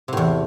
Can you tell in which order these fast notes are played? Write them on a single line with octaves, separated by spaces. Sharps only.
C3 A2 E2